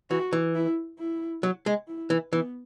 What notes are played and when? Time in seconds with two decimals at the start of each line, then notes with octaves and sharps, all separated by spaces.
0.10 E3 F#4
0.33 E3
0.55 E4
0.99 E4
1.43 F#3
1.66 G#3
1.88 E4
2.10 E3
2.33 E3 B3